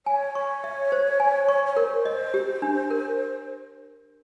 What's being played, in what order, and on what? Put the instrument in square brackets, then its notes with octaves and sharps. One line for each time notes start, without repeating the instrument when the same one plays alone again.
[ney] C#5 [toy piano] G#5
[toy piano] C#6
E5
C5
G#5
C#6
[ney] C#5
[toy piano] A#4 [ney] C5
[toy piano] D#5
G4
D4
A#4